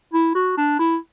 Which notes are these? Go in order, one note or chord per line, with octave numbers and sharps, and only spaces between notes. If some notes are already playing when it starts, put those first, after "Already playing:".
E4
F#4
D4
E4